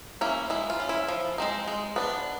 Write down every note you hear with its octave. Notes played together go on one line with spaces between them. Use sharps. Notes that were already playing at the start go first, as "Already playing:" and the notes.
A#3 C#4 E4
G#3 E4
F4
C#4
E4
F3
G#3 C4 D#4
G#3
B3 D4